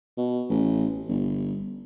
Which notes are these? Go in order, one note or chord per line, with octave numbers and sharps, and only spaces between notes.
B2
A1
G1